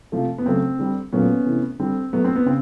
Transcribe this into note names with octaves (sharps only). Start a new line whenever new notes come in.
C3 F3 A3
B3
C#3 F#3 A3 C4
D3 G3
A#2 F#3 A3 B3 C#4
C3 E3 A3
D3 G3 C4
B2 F#3 A3 B3
C4
B3
C#3 C4